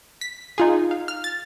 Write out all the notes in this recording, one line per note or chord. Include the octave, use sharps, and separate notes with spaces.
B6
D#4 F4 G#4
F5
F6
A6